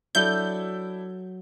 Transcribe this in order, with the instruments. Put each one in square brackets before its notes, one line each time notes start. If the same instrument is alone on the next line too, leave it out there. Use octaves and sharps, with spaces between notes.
[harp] F#3 [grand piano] D4 E4 A4 [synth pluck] G6